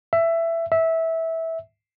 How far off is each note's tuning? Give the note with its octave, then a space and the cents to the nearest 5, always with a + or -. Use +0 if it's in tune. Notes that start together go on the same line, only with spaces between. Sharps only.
E5 +15
E5 -15